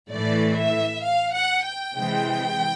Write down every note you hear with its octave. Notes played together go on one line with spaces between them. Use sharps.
A2 E3 A3 D5
E5
F5
F#5
G5
C3 E3 G#3